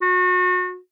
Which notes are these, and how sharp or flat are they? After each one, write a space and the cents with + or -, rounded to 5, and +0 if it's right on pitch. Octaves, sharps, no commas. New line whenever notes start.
F#4 -30